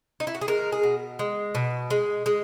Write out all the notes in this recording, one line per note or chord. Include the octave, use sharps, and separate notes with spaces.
D#4
E4
F#4
G#4
G#3 A#4
G#4
B2
G#3
B2
G#3
G#3